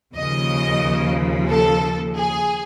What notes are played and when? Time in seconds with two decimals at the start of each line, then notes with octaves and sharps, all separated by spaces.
0.14 D#2 C#3 F3 D#5
1.49 A4
2.17 G#4